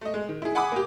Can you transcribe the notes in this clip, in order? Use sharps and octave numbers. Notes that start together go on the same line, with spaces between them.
A3 D#5
G#3
D#3
E4 G#4
F#5 G#5 B5 D6 D#6
A#3 G4